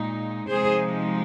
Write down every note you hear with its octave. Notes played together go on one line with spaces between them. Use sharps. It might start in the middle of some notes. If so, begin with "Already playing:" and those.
Already playing: A#2 G#3 D#4
C3 F3 G#3 D#4 G#4 C5